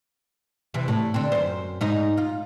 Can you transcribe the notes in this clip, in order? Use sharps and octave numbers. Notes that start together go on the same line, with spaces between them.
C3 E3
A2
D3 C4
F#2 C5
G#2 D#4 D#5
F4